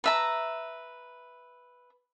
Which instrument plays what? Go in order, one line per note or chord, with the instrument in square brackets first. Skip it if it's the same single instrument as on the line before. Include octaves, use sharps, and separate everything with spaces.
[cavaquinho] B4 E5 A#5